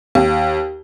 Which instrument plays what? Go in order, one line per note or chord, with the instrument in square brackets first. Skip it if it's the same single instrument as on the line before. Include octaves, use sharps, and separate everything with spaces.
[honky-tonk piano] D#2